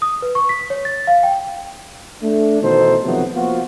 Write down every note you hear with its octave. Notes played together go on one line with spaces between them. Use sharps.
D#6
B4
C#6
B6
C#5
A6
F5
G5
A3 D4
B2 D#3 E3 D#4 A4 C5
C3 D#3 F3 F#3 A3 B3
F3 A#3 B3 F4 F#4